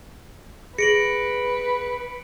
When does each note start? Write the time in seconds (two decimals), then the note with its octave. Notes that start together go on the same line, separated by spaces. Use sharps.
0.78 G#4 B4 A#6 C#7 D7 F#7